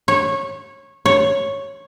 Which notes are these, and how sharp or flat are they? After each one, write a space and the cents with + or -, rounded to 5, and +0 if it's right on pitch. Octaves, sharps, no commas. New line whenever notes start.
C#5 -20
C#5 -5